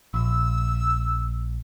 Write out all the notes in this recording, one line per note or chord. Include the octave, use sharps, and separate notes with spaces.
A#1 E6